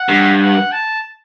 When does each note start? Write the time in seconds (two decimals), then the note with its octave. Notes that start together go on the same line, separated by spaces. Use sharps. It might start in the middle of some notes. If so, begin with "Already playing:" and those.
Already playing: F#5
0.09 G2
0.41 F#5
0.72 A5